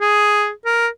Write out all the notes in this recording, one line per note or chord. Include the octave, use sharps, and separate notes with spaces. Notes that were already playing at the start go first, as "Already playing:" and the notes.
G#4
A#4